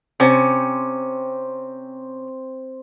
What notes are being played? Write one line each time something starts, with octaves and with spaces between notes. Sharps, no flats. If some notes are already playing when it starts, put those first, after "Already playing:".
C3 C4 C#4